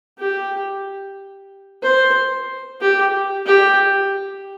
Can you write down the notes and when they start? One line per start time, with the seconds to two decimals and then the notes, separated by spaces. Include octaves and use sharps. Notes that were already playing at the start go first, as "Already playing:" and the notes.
0.19 G4
1.83 C5
2.81 G4
3.46 G4